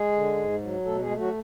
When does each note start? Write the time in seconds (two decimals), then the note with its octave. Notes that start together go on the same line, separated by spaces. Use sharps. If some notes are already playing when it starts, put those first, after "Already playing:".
Already playing: G#3 G#4
0.12 D3
0.36 G#2
0.61 F#3
0.85 B2 A3 A4
1.02 G#3 G#4
1.10 A3
1.17 F#3 F#4